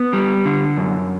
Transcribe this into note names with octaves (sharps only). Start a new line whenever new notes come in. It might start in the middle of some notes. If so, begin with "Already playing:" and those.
Already playing: B3
G3
D3
F#2